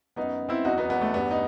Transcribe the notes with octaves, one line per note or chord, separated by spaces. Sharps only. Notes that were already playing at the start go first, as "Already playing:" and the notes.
F#2 B3 D#4
F#2
C4 E4
E2 D#4 F#4
B3 D#4
E2 B3
A3
G2 B3
D#4